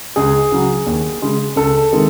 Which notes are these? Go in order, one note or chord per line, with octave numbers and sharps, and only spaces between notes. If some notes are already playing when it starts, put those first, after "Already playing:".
C#2 G#4
C#3 F#3
D#2
C#3 G#3
C#2 A4
C3 D#3 G#3